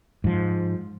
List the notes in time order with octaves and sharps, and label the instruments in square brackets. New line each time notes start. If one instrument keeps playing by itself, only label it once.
[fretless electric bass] G#2 F3